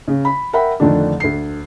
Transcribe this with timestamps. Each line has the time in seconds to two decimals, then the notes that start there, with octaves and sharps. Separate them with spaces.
0.08 C#3
0.25 B5
0.53 A#4 E5 F#5 G5 B5
0.80 F2 D3 D#3 A3 D4
1.20 D2 C7